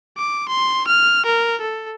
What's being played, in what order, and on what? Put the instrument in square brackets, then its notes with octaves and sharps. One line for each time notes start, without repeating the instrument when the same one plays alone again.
[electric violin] D6
C6
F6
A#4
A4